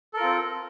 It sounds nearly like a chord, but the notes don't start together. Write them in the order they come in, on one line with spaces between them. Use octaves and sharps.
A4 A#4 F4 C4